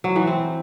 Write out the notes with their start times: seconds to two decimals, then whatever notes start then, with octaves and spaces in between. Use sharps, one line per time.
0.04 F#3
0.16 E3
0.27 C4